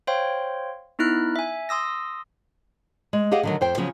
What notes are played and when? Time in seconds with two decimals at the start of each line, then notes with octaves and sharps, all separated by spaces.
0.07 C5 C#5 F5 G5 C6
0.99 B3 D#4 E4 F6 F#6
1.36 E5 G#5
1.69 C6 D#6 E6 A#6
3.13 G#3
3.32 G4 G#4 D#5 F5 F#5
3.43 D3 D#3 F#3
3.61 F2 C5 G5
3.77 C#3 F3 F#3 C#4